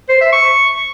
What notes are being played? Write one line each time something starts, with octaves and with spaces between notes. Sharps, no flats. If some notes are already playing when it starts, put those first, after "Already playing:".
C5
E5
C#6